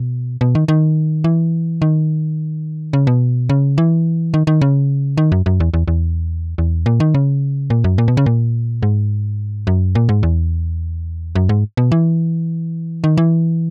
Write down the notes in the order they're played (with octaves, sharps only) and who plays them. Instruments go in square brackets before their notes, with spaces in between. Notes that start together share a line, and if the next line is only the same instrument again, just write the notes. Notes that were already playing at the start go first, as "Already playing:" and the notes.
Already playing: [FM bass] B2
B2
D#3
D#3
E3
D#3
C#3
B2
C#3
E3
D#3
D#3
C#3
D#3
F#2
F#2
E2
E2
E2
E2
A#2
D#3
C#3
A#2
F#2
A#2
B2
C#3
A#2
G#2
F#2
A#2
G#2
E2
F#2
G#2
B2
E3
D#3
E3